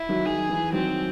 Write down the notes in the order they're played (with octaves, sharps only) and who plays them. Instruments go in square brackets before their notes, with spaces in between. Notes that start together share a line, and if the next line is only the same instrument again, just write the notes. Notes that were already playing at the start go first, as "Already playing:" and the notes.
Already playing: [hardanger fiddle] E4
[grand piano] D#3 F#3
[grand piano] D#3 [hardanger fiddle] G#4
[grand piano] E3
[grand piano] D#3 F#3 [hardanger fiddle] C4